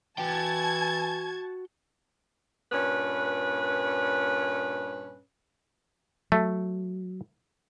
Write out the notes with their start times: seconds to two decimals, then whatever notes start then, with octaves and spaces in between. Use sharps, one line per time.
0.18 E3 F#4 G5 A5 G#6
2.72 G2 A#2 C#4 B4
6.32 F#3 A3